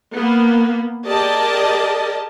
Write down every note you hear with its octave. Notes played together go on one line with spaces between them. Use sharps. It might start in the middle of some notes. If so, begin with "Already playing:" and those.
A#3 B3
G4 G#4 A#4 D5 D#5 A5